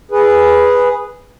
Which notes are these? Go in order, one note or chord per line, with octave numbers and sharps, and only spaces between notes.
G#4 B4